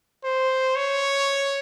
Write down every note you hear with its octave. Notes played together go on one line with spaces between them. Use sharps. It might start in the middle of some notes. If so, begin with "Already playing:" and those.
C5
C#5